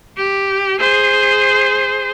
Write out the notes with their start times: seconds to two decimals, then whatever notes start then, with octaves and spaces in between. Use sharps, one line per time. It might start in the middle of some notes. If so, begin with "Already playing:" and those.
0.16 G4
0.79 G#4 C5